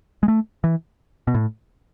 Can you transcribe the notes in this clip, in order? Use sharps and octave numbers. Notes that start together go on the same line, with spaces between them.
G#3
A3
E3
B2
A2